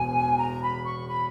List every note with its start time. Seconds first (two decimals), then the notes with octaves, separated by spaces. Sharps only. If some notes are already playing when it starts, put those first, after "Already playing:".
Already playing: E1 E2 G#5
0.38 A#5
0.61 B5
0.84 C#6
1.07 B5